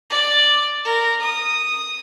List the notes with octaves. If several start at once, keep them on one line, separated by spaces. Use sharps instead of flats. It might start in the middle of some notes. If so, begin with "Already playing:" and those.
D5
A#4
D#6